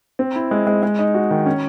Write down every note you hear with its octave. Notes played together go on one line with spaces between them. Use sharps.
C4
E4
G#3
G#3
G#3
D#4
F#4
D#3
C#4